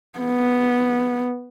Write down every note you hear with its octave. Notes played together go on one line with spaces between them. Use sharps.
B3